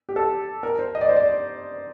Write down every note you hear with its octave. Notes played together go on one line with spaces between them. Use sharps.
G4
A4
A#4
C5
D#5
D5
C5
D5